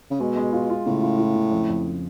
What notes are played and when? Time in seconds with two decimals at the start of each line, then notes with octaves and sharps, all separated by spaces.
0.11 C#3
0.20 B2 G#3
0.37 G#3
0.53 F4
0.70 F4
0.86 A2 C#3
1.02 F4
1.19 F4
1.36 C#3
1.52 F2
1.69 F2